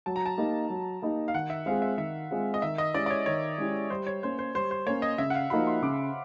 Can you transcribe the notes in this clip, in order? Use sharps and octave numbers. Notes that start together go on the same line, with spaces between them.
F#3 A5
A#5
A5
A#3 D#4 G4
F#3
A#3 D#4 G4
F5
D#3 F#5
E5
G#3 C4 F4 G#4 F5
E5
D#3 E5
G#3 C4 F4 G#4
D#5
D#3 E5
D#5
G#3 C#4 E4 G4 D5
D5
C#5
D#3 C#5
G#3 C#4 E4 G4
G3 C5
C#5
A#3 C#4 C5
C5
G3 C5
C5
A#3 C#4 C#5
D#5
C#3 E5
F#5
F5
F3 A#3 D#4 F#4 B5
C6
C#3 D6